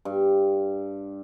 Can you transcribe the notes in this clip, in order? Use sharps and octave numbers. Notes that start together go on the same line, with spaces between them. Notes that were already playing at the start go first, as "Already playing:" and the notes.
G2